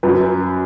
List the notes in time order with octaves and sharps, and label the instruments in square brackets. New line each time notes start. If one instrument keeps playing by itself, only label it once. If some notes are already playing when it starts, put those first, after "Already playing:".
[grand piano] F#2 B4